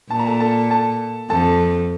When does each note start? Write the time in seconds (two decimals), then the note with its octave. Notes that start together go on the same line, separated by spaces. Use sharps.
0.10 A#2 A5
0.19 A#5
0.27 A4 A5
0.40 A4 A5
0.70 A4 A5
1.30 F2 A4 A5